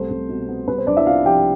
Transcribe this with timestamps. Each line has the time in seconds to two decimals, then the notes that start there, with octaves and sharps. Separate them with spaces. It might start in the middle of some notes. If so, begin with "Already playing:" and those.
Already playing: C2 A3 C5
0.10 C2
0.29 B2
0.49 B3
0.67 C2 B4
0.78 C5
0.87 C2 D4 D5
0.97 E4 E5
1.06 C3 F4 F5
1.26 F3 G4 G5